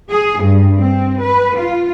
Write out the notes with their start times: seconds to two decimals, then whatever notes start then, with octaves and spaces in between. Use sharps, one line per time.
0.11 G#4
0.43 G2
0.79 C4
1.22 B4
1.58 F4